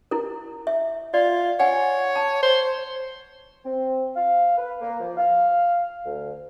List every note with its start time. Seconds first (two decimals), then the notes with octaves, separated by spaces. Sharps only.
0.11 E4 A#4
0.67 E5
1.14 F4 D5
1.60 C#5 F#5 G#5
2.16 A5
2.43 C5
3.64 C4
4.16 F5
4.57 B4
4.81 A#3
5.00 F3
5.17 F5
6.05 D2